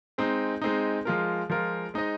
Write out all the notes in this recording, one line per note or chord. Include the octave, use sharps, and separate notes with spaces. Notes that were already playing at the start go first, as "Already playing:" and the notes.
G#3 C4 D#4
G#3 C4 D#4
F3 G#3 F4 A#4
F3 G#3 F4 A#4
G#3 D#4 C5 D#5